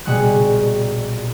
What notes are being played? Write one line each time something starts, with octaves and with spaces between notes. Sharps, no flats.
A#1 B2 G3 G#3 C#6 F#6